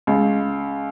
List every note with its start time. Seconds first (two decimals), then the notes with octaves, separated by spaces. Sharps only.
0.07 C#2